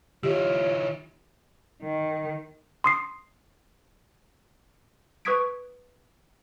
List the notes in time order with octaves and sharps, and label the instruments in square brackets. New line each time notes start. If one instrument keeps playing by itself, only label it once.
[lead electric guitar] D#3 E4 [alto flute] F4 [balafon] G4 [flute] C#5
[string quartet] D#3
[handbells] C6 D#6 C7
B4 C#6 D#6 G#6 B6 D7